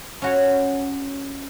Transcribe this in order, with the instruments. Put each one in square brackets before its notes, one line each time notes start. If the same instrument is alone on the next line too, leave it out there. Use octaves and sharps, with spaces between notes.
[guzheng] C#4 F#4 C#5